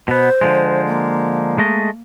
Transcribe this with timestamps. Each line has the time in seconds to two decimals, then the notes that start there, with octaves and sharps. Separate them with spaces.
0.08 B2 B3 C5
0.41 D3 F3 G#3
0.87 A#3
1.58 G#3 A3 D#5